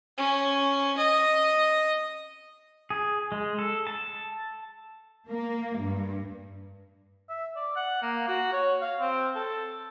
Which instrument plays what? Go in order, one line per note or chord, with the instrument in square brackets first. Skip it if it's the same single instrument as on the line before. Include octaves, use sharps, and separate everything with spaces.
[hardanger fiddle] C#4
D#5
[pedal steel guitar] G#4
G#3
A4
A5
[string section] A#3
G2
[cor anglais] E5
D5
F#5
A#3
F#4
C#5
F5
C4
A4